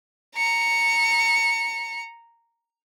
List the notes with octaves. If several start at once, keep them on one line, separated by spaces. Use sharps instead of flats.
A#5 C#7